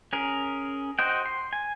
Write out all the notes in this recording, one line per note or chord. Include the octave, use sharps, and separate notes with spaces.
C#4 G#4 A#4
F#4 C5 D#5 G5
C6
G#5